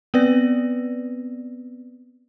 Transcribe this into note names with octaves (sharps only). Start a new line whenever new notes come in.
B3 C4 B4 D5 A#6